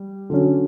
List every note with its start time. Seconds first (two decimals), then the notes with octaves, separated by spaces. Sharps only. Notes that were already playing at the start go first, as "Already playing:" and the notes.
Already playing: G3
0.30 D3 F#3 C#4